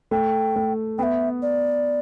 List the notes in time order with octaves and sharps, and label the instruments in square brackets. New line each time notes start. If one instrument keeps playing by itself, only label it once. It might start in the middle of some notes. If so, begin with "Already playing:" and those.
[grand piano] A3 [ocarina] G5
[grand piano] A3
[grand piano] B3 [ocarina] E5 G5
[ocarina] D5